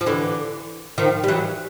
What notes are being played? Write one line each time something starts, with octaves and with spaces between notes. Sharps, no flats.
F3
D3 E3
D#3 F3
G3
E3 F#3